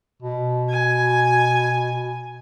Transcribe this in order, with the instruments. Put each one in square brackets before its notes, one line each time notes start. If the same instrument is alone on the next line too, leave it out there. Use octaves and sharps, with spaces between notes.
[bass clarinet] B2
[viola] G#5